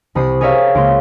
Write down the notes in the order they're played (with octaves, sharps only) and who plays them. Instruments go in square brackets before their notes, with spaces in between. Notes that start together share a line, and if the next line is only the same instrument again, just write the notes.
[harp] C2 C4 B5 D#6 C7
G#4 A#4 C#5 E5 F5
C#2 A#3 C6 D7